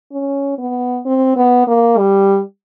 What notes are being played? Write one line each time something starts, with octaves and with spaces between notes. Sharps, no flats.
C#4
B3
C4
B3
A#3
G3